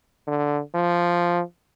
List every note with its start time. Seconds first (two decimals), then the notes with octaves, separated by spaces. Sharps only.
0.27 D3
0.74 F3